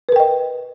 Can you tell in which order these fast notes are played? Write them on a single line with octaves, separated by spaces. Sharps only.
B4 A#4 G5 D#5